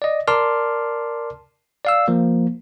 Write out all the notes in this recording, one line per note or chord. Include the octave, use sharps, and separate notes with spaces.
D5 D#5
A#4 D5 A5 C6 D6 F6
D5 F5 E6
F3 A#3